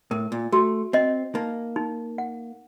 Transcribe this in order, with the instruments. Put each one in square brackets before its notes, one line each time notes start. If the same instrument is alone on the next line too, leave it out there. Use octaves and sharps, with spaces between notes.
[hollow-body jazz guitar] A2 [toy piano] A#4
[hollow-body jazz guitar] A#2
[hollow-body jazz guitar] A3 [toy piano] F#4
[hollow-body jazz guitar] C4 [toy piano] D#5
[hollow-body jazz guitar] A#3 [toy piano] D#4
[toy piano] D#4
F#5